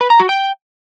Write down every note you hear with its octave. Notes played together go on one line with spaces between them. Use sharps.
B4
A#5
F#4
G5